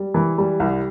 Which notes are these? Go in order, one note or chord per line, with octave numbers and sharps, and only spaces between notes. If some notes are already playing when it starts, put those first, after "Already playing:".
Already playing: G3
E3
G3
C2